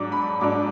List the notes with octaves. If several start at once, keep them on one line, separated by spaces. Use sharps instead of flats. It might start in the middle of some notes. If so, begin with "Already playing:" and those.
Already playing: G#2 F#3 D4 D6
B5
G#2 F#3 D4 D6